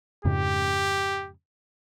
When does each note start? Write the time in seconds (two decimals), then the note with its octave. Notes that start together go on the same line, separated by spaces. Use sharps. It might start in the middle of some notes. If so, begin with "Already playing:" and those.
0.25 F2 G#2 C#3 G4